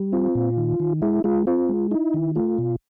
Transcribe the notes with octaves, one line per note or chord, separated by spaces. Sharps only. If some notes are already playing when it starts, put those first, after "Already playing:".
Already playing: G3
C4 F4
A#2
D#3
D#3
G#3 E4
G#3 F4
C4 F4
G#3
D#4 E4
D#3
A3 F4
B2